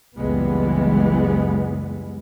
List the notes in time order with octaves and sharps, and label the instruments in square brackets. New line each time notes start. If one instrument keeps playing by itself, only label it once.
[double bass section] F#1 C#2 E3 G3 G#3 B3